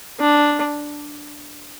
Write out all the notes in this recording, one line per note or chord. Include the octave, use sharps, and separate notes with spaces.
D4